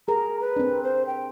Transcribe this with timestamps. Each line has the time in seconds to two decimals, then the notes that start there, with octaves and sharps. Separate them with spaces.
0.08 G#4 A#4 A#5
0.40 B4
0.56 C4 D4
0.83 C5
1.07 G5